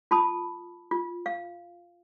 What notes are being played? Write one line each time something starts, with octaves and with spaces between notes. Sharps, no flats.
F4 A5 B5 D#6
F4
F5